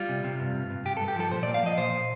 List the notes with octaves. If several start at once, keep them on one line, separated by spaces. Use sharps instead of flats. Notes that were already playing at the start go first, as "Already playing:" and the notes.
Already playing: G3 F4
C3
C3
G2
G2
G2
G2 G4
G2 A4
G4
F3 A4
A#2 C5
A#3 D5
F5
F3 D#5
A#2 C5
A#2